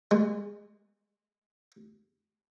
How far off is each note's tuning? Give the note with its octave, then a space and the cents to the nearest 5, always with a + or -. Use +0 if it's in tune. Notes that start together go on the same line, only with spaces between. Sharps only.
G#3 -25